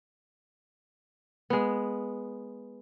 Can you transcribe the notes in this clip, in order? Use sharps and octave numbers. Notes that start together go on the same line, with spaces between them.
G#3 B3